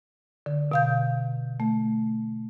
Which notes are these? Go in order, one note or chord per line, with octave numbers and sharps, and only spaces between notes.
D3
B2 F5 G6
A3